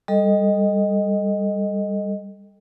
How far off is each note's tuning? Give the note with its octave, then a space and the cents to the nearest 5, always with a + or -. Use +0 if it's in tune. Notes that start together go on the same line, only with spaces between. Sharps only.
G3 +15 A4 +0 D#5 +0